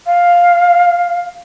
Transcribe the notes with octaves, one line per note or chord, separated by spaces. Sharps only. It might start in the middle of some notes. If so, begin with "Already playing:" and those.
F5